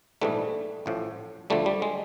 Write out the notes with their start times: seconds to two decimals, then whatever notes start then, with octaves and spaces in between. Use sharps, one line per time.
0.21 A#1 G#2 E3 G3 A3
0.86 A1 A2 F3
1.50 D2 D3 F3 G3 A3
1.66 G3
1.82 G#3